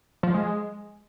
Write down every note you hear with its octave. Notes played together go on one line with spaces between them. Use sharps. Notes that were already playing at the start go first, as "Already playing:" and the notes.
F3
G#3